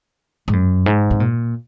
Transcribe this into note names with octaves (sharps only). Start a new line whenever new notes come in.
G#2
F#2
G#2
C3
A#2